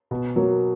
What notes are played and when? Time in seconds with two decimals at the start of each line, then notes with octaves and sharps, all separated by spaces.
0.11 B2
0.36 F#3 A#3